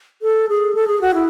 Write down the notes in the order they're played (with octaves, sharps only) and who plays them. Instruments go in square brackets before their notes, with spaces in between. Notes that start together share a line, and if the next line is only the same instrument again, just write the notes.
[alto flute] A4
G#4
A4
G#4
F#4
E4